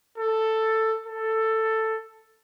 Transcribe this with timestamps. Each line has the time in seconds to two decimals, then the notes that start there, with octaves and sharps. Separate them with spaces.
0.18 A4
1.07 A4